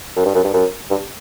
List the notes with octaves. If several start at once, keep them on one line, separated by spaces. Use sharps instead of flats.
F#2
G2
F#2
G2
F#2
G2